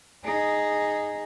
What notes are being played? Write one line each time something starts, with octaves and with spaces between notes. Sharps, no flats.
D#4 G#4